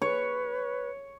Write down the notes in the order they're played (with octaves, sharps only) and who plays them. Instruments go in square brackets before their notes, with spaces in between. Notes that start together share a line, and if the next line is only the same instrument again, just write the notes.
[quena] B4 [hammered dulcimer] C#5